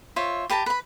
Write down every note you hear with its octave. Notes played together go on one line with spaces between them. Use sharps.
F4 C5 C#5 E5
G4 B4 A5 A#5
B4 B5